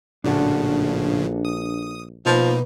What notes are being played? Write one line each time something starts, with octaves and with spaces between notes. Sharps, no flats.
A#1 A2 C#3 F3 D4 F#4 A4
D#6
B2 F3 A#3 D#4 B4